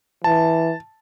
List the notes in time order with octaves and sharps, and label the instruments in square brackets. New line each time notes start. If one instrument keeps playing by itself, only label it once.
[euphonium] E3 [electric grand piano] A5